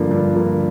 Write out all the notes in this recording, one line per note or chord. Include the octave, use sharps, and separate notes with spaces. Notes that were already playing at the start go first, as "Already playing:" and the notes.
Already playing: G2 D3 F3 A#3
G2
D3 F3 A#3